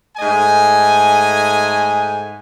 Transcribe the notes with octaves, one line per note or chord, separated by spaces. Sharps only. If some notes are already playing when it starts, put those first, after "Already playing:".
G#2 A3 D#5 G#5